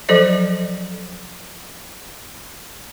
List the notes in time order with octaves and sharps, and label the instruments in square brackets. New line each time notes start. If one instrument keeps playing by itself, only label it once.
[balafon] F3 F#3 A4 C5 D#5